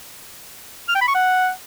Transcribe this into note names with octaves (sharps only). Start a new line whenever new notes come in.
F6
G5
B5
C#6
F#5